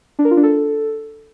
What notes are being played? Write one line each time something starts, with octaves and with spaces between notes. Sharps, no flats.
D4
A#4
F4
D4
A4